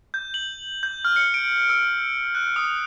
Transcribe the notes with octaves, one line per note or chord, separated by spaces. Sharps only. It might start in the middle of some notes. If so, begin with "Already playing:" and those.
G6
F#7
G6
F6
C#7
D7
E6
F#6
D#6